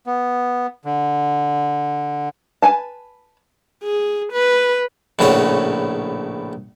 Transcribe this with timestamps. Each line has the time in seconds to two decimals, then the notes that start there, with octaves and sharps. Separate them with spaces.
0.06 B3
0.85 D3
2.62 B4 G#5 A5
3.84 G#4
4.33 B4
5.19 A#1 A2 C#3 F#4 C#5